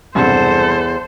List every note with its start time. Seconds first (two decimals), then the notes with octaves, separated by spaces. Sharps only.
0.15 B1 E2 G2 C3 A4 C5